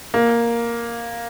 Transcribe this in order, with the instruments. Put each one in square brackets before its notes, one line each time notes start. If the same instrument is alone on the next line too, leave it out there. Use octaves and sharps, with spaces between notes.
[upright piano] A#3